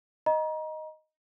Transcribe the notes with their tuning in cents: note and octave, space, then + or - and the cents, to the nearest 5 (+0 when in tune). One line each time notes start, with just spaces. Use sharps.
D#5 +0 A#5 +30